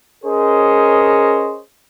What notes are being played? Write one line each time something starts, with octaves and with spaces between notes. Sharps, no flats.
C#4 G#4 A#4 C5 C#5 D#5